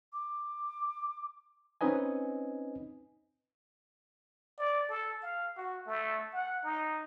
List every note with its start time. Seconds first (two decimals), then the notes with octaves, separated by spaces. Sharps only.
0.13 D6
1.81 C4 C#4 D#4 B4 D#5 G#5
4.58 D5
4.89 A4
5.23 F5
5.57 F#4
5.87 A3
6.34 F#5
6.63 D#4